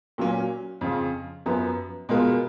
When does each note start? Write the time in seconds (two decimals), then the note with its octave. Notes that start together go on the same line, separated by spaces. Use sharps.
0.18 A#2 F#3 A#3 C#4
0.81 F2 C#3 F3
1.46 F#2 F3 B3
2.09 B2 G#3 B3 F4 A#4